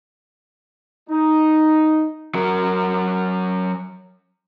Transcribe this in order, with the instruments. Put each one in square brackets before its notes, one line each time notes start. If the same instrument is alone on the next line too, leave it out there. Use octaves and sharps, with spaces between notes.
[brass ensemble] D#4
[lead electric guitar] F#3 A#4